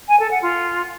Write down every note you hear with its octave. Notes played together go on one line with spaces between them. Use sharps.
G#5
A4
F#5
F4